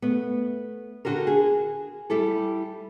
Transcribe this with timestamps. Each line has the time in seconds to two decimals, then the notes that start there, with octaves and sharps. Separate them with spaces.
0.02 A3 B3
1.05 D3 F#4 G4 A#4
1.27 G#4
2.10 G3 E4 G4 A4